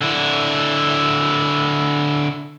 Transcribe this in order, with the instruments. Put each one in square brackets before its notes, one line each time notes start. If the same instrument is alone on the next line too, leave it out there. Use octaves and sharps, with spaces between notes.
[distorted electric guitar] D3 E4